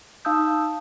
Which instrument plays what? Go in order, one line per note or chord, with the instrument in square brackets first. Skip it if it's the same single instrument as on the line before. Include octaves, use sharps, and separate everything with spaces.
[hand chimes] D#4 F5 A5 D#6 E6 G6